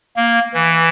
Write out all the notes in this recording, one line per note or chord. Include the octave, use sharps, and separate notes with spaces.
A#3
E3